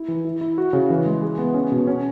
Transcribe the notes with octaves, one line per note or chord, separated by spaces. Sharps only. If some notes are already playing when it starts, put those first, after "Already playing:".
Already playing: E4
E3
E4
E4
F#4
C#3
E3
G#3
G#4
B3
C#4
B2
C#4